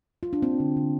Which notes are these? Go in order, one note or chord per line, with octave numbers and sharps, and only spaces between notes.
F4
D4
A#3 C4
D3
D3